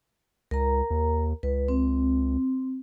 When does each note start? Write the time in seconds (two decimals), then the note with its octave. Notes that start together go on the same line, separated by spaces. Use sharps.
0.51 C#2 A#4 A#5
0.90 D#2
1.43 C#2 B4
1.68 C4